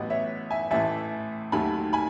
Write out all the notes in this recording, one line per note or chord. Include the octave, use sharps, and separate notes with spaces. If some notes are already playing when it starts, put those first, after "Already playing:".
Already playing: A1 A2 F#3 B3 B4 D#5
C#5 E5
E5 G#5
A1 A2 E3 A3 E5 G#5
D#2 D#3 F#3 A3 G#5 B5
G#5 B5